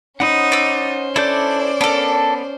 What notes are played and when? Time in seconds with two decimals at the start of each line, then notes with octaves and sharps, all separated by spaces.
0.20 C#4 D#4 C5 F#5 B5 D#6
0.52 D5 E6
1.16 D4 E4 A4 D5 G6
1.81 B3 D4 A4 A#4